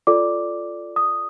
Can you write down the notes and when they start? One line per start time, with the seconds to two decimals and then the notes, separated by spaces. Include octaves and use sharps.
0.07 F4 A4 D5 D6
0.96 D#6